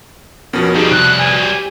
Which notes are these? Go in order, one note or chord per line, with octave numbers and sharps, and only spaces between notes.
F2 B2 F3 B3 C#4 A#4
G2 C4 D#4 G4 G#4
C3 F#6
G#5
G4